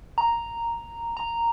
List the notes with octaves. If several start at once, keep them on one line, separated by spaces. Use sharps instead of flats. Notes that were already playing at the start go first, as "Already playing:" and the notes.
A#5
A#5